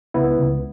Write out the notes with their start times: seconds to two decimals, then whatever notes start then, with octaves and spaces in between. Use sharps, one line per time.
0.14 C#2 B3 E4
0.37 C#2